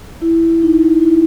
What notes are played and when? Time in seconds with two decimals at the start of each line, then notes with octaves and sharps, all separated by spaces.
0.22 E4
0.62 D#4
1.02 E4